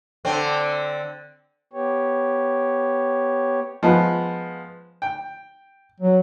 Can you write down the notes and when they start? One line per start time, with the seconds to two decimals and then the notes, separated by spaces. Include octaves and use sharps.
0.25 D3 C4
1.73 B3 G4 C#5
3.83 F3 G#3 B3
5.02 G5
6.00 F#3